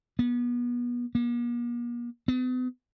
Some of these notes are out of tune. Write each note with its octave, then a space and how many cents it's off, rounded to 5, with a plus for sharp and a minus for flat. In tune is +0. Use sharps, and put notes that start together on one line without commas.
B3 -30
A#3 +45
B3 +40